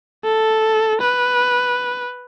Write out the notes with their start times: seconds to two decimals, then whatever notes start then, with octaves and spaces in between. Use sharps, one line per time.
0.24 A4
1.01 B4